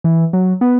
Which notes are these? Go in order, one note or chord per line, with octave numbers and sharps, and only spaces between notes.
E3
F#3
B3